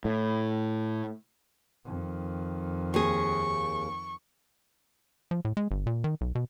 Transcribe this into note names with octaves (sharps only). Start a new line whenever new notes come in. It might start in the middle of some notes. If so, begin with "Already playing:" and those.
A2
F2 D#3
D#2 G#4 C#6
F3
A2
G#3
G1
A#2
D#3
B1
B2